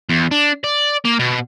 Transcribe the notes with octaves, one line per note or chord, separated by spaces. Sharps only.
E2
D4
D5
A#3
B2